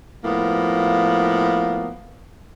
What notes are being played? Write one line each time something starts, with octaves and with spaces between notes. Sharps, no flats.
A2 F3 A#3 B3